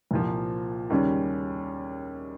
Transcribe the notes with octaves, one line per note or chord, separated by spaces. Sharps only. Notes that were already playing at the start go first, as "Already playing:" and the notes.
C2 A#2 F3
D#2 C#3 G3 C#4